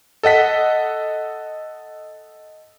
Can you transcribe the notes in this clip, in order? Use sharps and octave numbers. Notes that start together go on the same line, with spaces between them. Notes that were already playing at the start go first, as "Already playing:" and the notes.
A4 D#5 F#5 B6